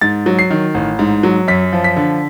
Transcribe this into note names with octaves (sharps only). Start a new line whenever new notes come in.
G#2 A6
F#3
C7
D#3
A1
G#2
F#3
F#2 B6
F3
B6
D3